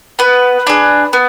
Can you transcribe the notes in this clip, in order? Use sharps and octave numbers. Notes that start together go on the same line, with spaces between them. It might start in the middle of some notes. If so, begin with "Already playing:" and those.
B3 B4
D4 G#4
B3